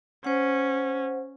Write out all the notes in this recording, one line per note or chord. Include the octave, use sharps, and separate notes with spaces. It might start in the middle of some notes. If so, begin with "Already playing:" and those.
C#4 C5 F#5